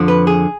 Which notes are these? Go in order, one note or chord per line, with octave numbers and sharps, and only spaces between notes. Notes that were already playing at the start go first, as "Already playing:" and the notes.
Already playing: F2 D3 F3
B4
G#4